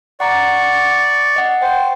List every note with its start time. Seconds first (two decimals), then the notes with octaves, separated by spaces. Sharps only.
0.20 D5 F#5 A#5 C#6
1.36 D#5 F#5
1.62 C5 G5